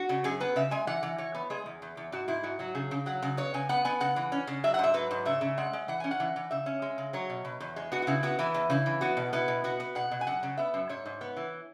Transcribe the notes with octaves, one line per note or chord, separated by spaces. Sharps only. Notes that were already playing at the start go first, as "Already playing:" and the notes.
Already playing: F#4
C#3
F#2 G#4
B3 B4
C#3 E5
G#3 G#5
E3 F#5
E3
E3 C#5
B3
G#3 G#4
E2
E2
E2
G#2 F#4
G#2 E4
G#2 F#4
F#3 F#4
C#3 G#4
C#3
F#3 F#5
C#3
B3 C#5
C#3 G#5
B3 F#5
B3 G#5
C#3 F#5
E3
C#4
C#3
F#3 E5
F#5
G#2 E5
F#3 B4
G#2
C#3 E5
C#3
G#3 F#5
G#3
E3 F#5
C#4 G#5
F#5
E3
E3
C#3 E5
C#4
G#3
C#3
F#3 C#5
B2
B2
E2
G#3
B3 F#4
F#4
C#3 E4
B3 F#4
E3 E4
E2
C#3 E4
E3
B3 F#4
B2
B3 E4
B2
B3 F#4
B3
B2 F#5
B2
G#5
F#2 F#5
C#3
B3 E5
F#2
G#2 C#5
G#2
B3
E3